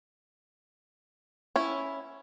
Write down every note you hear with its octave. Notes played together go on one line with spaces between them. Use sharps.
C#4 E4